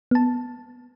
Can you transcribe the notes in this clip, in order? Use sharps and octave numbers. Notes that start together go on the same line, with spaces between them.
B3 A5